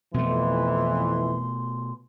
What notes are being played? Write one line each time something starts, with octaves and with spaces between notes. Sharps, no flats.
F2 B2 E3 A3 C6